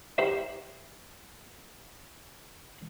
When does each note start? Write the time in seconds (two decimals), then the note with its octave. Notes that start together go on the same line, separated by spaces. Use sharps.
0.18 D#4 E4 G4 C5 F#5